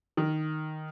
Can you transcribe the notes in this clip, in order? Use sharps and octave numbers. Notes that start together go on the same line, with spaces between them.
D#3